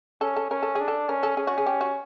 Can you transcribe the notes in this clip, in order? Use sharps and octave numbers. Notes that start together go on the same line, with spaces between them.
C#4 A4
A4
C#4 A#4
A4
D4 G#4
A4
C#4 A#4
A4
C#4 G#4
F#4
G#4
G4
F#4